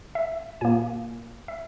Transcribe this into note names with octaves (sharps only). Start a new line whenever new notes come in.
E5
A#2 A#3 G#5
E5